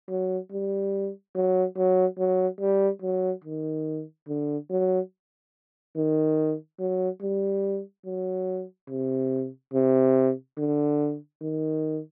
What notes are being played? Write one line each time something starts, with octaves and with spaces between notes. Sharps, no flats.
F#3
G3
F#3
F#3
F#3
G3
F#3
D#3
D3
F#3
D#3
F#3
G3
F#3
C3
C3
D3
D#3